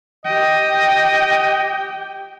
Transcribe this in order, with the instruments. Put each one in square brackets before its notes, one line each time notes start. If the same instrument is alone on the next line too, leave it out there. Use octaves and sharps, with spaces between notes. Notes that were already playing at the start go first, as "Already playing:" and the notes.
[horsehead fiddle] G4 G5 [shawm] D#5